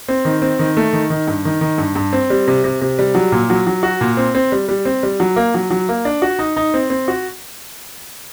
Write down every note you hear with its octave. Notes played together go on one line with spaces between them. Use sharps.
C4
D#3
C4
D#3
A3
D#3
D#3
G2
D#3
D#3
G2
G2
C4
G3
C3
C3
C3
G3
F#3
A#2
F#3
F#3
F#4
A#2
C4
C4
G3
G3
C4
G3
F#3
A#3
F#3
F#3
A#3
D4
F#4
D#4
D#4
C4
C4
F#4